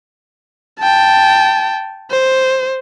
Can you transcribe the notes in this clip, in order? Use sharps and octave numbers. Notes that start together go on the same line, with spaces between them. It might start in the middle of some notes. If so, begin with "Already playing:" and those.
G5 A5
C5